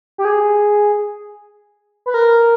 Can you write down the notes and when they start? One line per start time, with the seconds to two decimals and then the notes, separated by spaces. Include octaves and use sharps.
0.18 G4
0.25 G#4
2.06 B4
2.14 A#4